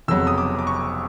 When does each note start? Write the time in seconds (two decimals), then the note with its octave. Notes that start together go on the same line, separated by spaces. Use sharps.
0.08 F1 F2 C#3 F#3 B3 E6
0.27 D#6
0.38 D6
0.59 D6
0.67 C#6